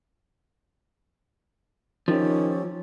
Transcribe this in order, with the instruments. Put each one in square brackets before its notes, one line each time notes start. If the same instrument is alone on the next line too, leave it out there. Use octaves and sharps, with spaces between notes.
[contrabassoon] D#3 [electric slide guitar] F3 G4 [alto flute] C#4